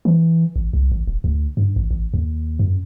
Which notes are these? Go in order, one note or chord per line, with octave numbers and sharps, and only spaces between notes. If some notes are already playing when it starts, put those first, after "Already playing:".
E3
A1
C2
A1
D#1
D2
G2
A1
A1
D#2
F#2